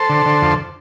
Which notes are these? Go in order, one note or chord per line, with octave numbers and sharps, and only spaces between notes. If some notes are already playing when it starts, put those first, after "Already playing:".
Already playing: A4 C5
D3
D3
F2